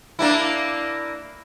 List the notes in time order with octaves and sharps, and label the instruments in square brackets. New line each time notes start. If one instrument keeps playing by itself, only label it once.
[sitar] A#3 D4 E4